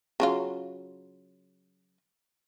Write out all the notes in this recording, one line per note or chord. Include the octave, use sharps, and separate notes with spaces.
C#3 F#3 F4